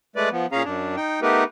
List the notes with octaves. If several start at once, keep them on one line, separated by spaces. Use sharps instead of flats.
G#3 A3 B4 D5
F3 B3
A#2 C#4 G#4 F5 A#5
F#2 D4
D#4 G5
A3 B3 D#4 G4 A#4 B4